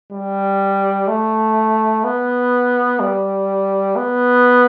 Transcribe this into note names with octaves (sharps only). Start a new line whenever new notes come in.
G3
A3
B3
G3
B3